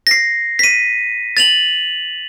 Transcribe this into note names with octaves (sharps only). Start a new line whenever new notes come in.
A#6 C7
B6 D#7
A6 F7 F#7